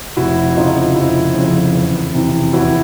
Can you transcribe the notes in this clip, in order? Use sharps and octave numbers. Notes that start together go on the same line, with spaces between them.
F1 E4 F#4
F2 C#3 F3 D#4 F4
F1 E4
F2 C#3 F3
E2
C3 E3
E2 E4 F#4